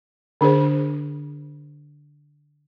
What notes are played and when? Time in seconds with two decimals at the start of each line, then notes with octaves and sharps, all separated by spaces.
0.41 D3 D4 G#4 C5